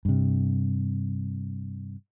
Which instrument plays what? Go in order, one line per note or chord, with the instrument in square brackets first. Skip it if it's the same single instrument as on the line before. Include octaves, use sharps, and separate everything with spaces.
[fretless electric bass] G2 C3